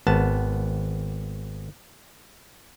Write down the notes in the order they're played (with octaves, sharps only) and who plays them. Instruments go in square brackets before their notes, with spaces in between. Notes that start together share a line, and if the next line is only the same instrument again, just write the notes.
[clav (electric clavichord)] G#1 B3 A5